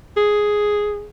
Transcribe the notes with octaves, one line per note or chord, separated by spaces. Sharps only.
G#4